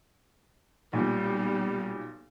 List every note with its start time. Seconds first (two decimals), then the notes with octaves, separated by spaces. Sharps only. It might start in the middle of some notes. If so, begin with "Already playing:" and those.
0.93 B1 A#2 G3